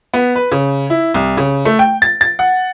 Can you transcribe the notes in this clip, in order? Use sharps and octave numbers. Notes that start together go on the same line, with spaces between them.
B3
B4
C#3
E4
C2
C#3
A3
G5
A6
A6
F#5